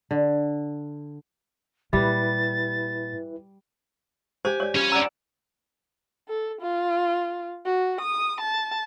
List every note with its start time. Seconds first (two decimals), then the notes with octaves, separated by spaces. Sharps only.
0.11 D3
1.93 A#2 G3 E4 B4 A6
4.45 G4 C5 G#5
4.60 C#5 D5
4.75 G3 C#4 F4 G#5
4.92 D5 F#5 A#5 E6
6.29 A4
6.61 F4
7.66 F#4
8.01 D#6
8.41 A5